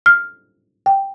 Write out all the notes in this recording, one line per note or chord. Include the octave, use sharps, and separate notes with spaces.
F6
G5